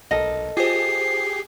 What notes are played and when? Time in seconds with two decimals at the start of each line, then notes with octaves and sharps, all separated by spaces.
0.11 B1 A4 A#4 D#5
0.57 F4 G4 G#4 C5 C7